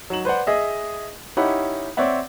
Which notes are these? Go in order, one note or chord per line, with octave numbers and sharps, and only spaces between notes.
F#3 D#4 E7 F#7
B4 C5 D5 F#5
G#4 D#5 E5
C#4 D#4 E4 G4 F#5 B5
C4 C#5 D5 E5 F#5